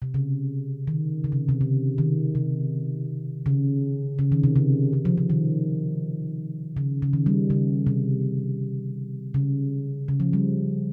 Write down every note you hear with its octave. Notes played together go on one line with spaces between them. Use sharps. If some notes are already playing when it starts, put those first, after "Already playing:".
C3
C#3
D#3
C#3
C3
C3
C#3
D#3
C3
C#3
C#3
D#3
C3
C#3
C#3
F3
F3
D#3
C#3
C#3
D#3
G3
C#3
C3
C#3
C#3
F3
G3